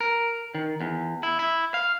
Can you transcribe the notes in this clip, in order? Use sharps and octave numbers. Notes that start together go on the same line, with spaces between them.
A#4
D#3
E2
E4
E4
F5